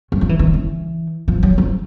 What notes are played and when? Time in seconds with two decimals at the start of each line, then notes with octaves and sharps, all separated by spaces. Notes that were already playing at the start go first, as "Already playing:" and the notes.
0.12 F#3
0.21 F3
0.29 E3
0.39 D#3
0.54 E3
1.28 F3
1.43 F#3
1.58 F3